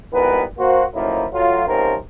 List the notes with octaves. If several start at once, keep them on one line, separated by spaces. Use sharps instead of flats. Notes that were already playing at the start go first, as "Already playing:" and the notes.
G#1 E3 G3 B3 A#4 B4
A#3 F#4 C5
F#2 A2 F3 A#3 D#4 E4
F#3 A3 F4
G#2 C3 F3 C#4 A#4 C5